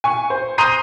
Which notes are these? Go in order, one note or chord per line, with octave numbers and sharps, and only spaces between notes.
G#5 C#6
C5
A#5 C6 D#6 G6 C7 D#7